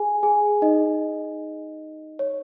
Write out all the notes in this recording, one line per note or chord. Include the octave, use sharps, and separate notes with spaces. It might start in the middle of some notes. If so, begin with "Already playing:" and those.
Already playing: G#4 G#5
G#4 G#5
D#4 D#5
C#5